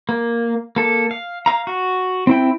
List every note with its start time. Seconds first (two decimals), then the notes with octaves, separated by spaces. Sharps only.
0.09 A#3
0.76 A#3 A4
1.11 F5
1.46 F5 A#5
1.67 F#4
2.27 C4 E4 G5